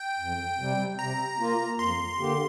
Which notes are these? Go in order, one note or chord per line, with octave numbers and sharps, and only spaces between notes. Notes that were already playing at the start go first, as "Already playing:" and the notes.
Already playing: G5
F2
C3 G3
C3 A#5
A#3 F4
F2 C6
D3 A#3 G4